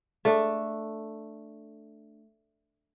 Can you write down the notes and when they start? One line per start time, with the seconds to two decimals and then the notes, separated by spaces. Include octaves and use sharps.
0.25 A3 D4